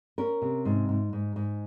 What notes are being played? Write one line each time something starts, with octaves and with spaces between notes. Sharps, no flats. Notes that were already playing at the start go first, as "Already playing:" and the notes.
C#4 A#4
C3
G#2
G#2
G#2
G#2